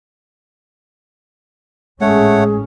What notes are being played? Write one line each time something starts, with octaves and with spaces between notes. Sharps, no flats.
G#1 A2 G#3 A3 C#4 G#4 C#5 F#5